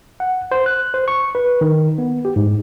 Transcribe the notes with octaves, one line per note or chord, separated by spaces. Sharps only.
F#5
C5
F#6
C5
C#6
B4
D#3
B3
G4
G#2